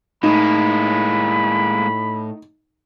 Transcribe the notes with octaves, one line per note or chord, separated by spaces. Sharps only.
A2 G#3 A#3 D#4 B5